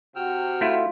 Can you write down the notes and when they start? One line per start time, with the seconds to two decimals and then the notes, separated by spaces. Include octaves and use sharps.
0.16 C3 F#4 G5 E6 F6
0.61 A3 E4 F4